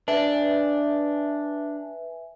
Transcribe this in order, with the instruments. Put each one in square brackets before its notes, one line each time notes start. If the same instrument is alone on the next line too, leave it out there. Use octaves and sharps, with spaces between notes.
[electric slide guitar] D4 [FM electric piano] B4 E5 G#5